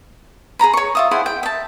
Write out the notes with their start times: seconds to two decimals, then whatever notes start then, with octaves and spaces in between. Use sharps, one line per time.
0.59 G#4 A#4 A#5 B5
0.73 C#5 C#6
0.95 F4 E5 D#6
1.11 E4 G#4 C5 F#5
1.26 G5
1.43 E5 A5